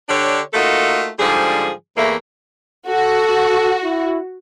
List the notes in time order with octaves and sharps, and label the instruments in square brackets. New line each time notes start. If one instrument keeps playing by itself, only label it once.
[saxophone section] D3 D4 G4 C#5
A3 A#3 D#4 F4 F#4 A4
G#2 D3 F3 G3 G#4
E2 A3 A#3
[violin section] F#4 [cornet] A4
[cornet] E4